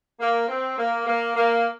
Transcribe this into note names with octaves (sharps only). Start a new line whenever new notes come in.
A#3
C4
A#3
A#3
A#3